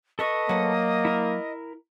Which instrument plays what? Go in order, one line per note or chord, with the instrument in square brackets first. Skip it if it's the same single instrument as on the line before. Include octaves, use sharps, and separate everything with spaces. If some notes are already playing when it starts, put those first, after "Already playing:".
[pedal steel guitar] A4 B4 C#6 [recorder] D#5
[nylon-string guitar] F#3 F#5 [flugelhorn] A#3
[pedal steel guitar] E4 A#4